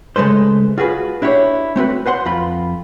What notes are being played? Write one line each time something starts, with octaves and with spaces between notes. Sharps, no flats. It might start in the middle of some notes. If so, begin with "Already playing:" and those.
C#3 G#3 A3 B4 C5
F4 F#4 G#4 B4
D4 E4 G4 C#5
A3 C4 F#4 B4
B4 C5 F#5 C6
F2 F4 B5